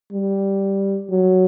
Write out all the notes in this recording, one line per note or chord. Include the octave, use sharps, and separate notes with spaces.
G3
F#3